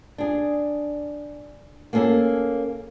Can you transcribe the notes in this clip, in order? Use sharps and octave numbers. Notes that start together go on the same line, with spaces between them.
D4 G#4
A#3 C#4 G#4 A4